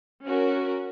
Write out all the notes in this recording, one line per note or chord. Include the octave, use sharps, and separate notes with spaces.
C#4 F#4 A#4